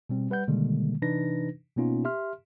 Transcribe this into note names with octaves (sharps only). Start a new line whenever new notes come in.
B2 G3 C4
G3 B4 F#5 G6
B2 D3 D#3 G3 G#3 A#3
C3 E3 D4 D#4 B4 A#6
B2 A#3 B3 C#4 D#4 F4
G4 E5 C6 F6